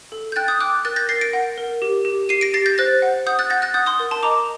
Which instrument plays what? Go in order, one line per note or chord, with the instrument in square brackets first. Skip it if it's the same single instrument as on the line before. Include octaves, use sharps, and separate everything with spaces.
[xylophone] A4
G6
G5 F#6 A6
D#6 G6
G5 D6 F#6
A#4 F#6 A6
G6 A#6
A#4 A6 C7
A#6 D7
F#5
A#4
G4
G4
G4 C7 D#7
A#6 D7
G4 A6 C7
G6 A#6
C5 F#6 A6
F#5
F#5 D#6 G6
F#6 A6
F#5 G6 A#6
F#6 A6
F#5 D#6 G6
C6 D#6
A#4
A5 C6
D#5 A#5 D6